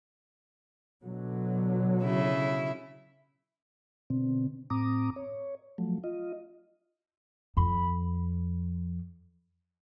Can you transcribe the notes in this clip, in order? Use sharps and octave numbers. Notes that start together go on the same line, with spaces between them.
B2 D3 F#3
C#3 E4
B2 D3 C4
A2 C4 A#5 D6 D#6
C#5
F3 F#3 A3
F4 D#5
F2 B5